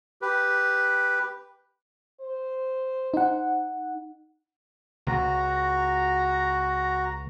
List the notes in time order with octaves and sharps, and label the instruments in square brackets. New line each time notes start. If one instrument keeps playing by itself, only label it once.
[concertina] G4 B4
[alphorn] C5
[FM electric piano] D#4 F#5
[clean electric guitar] C#2 [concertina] F#4 A#5